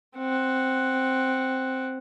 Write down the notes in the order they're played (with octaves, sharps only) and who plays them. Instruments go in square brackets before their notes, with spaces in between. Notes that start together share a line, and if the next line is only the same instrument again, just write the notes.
[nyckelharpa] C4 F#5